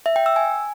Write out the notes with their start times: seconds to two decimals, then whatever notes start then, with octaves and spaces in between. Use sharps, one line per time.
0.06 E5
0.16 G5
0.26 E6
0.36 G#5